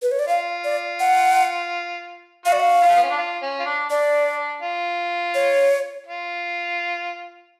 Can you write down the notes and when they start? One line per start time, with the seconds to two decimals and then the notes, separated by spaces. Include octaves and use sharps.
0.02 B4
0.11 C#5
0.19 D5
0.27 F4 F5
0.64 D5
1.00 F#5
2.45 F#4 F5
2.52 D5
2.60 F5
2.82 F4
2.88 A3
2.96 B3
3.02 C#4
3.10 D4
3.17 F4
3.42 C#4
3.60 F4
3.65 D4
3.90 D4 D5
4.62 F4
5.35 C#5
6.07 F4